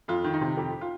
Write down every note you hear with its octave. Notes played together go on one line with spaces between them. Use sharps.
F2 F4
D#3
D#4
C3
F2 G4
F4